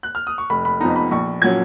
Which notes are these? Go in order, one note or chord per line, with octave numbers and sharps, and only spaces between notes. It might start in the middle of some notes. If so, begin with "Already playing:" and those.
F#6
F6
D#6
C#6
F1 B5
B5
F2 F3 B3 D#4 A#5
B5
A#1 C#6
A#2 F#3 C#4 G#6